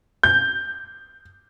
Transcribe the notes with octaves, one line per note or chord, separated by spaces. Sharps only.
G6